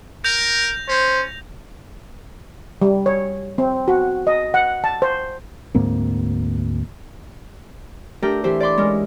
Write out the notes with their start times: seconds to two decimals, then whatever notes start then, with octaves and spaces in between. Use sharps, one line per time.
0.24 A#4 G6 A#6 F7
0.88 C#4 C5
2.82 G3
3.06 C#5
3.58 C4
3.88 F#4
4.27 D#5
4.54 F#5
4.84 A5
5.02 C5
5.75 D2 G#2 A#3 C4
8.22 A3 D4 G4 A#4 A#5 G6
8.44 E3 E4 G4 C5
8.60 D5 B5 C6 D6
8.77 G#3 C#4 A#4